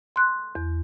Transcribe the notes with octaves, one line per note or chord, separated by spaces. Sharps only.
C6 F#6
E2